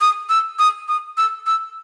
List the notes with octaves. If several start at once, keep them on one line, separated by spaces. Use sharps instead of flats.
D#6
E6
D#6
D#6
E6
E6